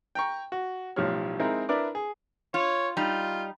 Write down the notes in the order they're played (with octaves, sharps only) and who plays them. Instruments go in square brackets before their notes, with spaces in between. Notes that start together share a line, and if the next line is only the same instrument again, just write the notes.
[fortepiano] G5 A#5 C#6
F#4
B1 A2 F3 G3 C#5 F6
G#3 C4 D#4 E4 A#4
D4 E4 A#4 B4 D5 D6
G#4
[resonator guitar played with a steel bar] F4 [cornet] C#5
[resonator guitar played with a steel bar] G3 D#4 [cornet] F4